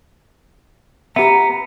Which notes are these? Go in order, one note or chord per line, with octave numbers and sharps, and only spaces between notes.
B3 G4 E5 A#5